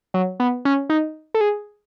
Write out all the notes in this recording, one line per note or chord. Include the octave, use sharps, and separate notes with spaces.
F#3
B3
C#4
D#4
A4
G#4